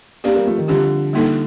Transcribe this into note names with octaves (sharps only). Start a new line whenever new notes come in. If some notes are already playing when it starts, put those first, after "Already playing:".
A#3 C4 D4 G4 A#4 D5
G3 A#3
F3 A3
D#3
D3 F3 G3 C4 G4
G3 A#3 D#4 A4